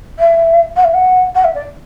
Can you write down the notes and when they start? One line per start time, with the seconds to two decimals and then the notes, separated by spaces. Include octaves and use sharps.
0.19 E5
0.76 F#5
0.84 E5
0.94 F#5
1.35 F#5
1.44 E5
1.55 D5